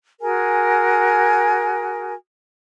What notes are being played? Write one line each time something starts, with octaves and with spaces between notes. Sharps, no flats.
F#4 G#4 A#4 G#5